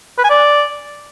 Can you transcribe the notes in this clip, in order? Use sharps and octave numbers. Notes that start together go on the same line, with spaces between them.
B4
G#5
D5